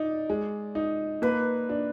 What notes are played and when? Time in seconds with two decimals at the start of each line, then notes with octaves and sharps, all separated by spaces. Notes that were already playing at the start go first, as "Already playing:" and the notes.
Already playing: D#4 D5
0.30 G#3
0.75 D#4
1.22 A#3 B4
1.69 D4